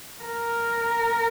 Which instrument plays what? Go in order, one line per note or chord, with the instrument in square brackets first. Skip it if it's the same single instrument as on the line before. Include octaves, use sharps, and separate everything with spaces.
[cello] A#4